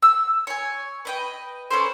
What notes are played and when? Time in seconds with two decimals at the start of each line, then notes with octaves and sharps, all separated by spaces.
0.02 E6
0.47 C#5 G#5
1.05 B4 D#5 G5
1.71 C#4 A4 B4 C5